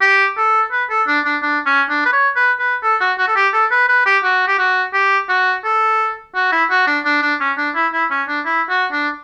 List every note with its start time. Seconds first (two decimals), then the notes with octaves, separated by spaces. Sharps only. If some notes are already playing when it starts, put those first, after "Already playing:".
0.01 G4
0.37 A4
0.72 B4
0.90 A4
1.07 D4
1.25 D4
1.42 D4
1.66 C#4
1.89 D4
2.05 B4
2.13 C#5
2.36 B4
2.59 B4
2.83 A4
3.00 F#4
3.18 F#4
3.28 A4
3.36 G4
3.53 A4
3.71 B4
3.89 B4
4.06 G4
4.24 F#4
4.48 G4
4.59 F#4
4.93 G4
5.29 F#4
5.64 A4
6.35 F#4
6.52 E4
6.70 F#4
6.87 D4
7.05 D4
7.22 D4
7.40 C#4
7.57 D4
7.75 E4
7.93 E4
8.11 C#4
8.28 D4
8.45 E4
8.69 F#4
8.92 D4